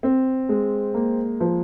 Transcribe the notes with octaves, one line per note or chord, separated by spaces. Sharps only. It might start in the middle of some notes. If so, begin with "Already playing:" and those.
C4
G#3
A#3
F3